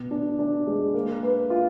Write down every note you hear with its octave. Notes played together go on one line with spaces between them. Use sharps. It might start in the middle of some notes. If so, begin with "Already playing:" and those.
Already playing: B2
D4
D4
G#3
A#3
B4
F4